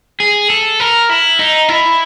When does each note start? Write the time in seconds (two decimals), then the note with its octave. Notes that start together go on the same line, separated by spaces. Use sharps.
0.20 G#4
0.50 A4
0.80 A#4
1.09 E4
1.39 D#4
1.69 E4